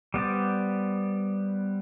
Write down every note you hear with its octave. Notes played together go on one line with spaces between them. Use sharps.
G3 B3 C5 D5